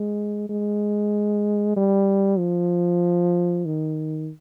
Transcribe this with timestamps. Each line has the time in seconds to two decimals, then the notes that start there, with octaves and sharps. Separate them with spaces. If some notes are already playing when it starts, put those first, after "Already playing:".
Already playing: G#3
0.49 G#3
1.76 G3
2.38 F3
3.65 D#3